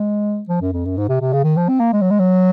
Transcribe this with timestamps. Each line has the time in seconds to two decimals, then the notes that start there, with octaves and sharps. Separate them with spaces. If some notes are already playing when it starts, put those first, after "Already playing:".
Already playing: G#3
0.49 F3
0.62 F#2
0.72 F2
0.85 F#2
0.97 G#2
1.09 C3
1.21 C3
1.33 C#3
1.44 D#3
1.57 F3
1.69 C4
1.80 A#3
1.93 G#3
2.01 F#3
2.10 G#3
2.19 F#3